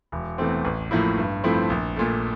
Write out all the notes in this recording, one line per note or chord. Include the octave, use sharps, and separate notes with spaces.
E1
E2 E3 A3 C4
A1
A2 F3 A#3 E4
G2
F3 A3 C4 E4
A#1
A#2 A3